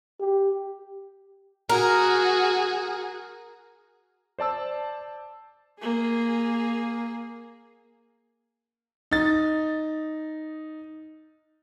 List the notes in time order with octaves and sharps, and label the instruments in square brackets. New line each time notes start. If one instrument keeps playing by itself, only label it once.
[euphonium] G4
[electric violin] F#4 G#4 [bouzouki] A#4
[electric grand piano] C5 D5 A5 E6
[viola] A#3 G#4
[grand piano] D#4 A6